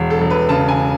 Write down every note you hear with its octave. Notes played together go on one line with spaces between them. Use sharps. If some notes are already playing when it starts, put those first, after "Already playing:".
Already playing: E1
A4
E1
B4
C#3 A5
G#5